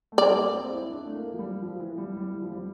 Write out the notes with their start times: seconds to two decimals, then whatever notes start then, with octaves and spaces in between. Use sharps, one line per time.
0.12 A3
0.18 G3 D5
0.36 A#3
0.54 C4
0.72 E4
0.90 D4
1.05 A3
1.15 A#3
1.33 F3
1.39 G3
1.62 F3
1.80 E3
1.98 G3
2.16 G3
2.34 E3
2.42 F3
2.52 G3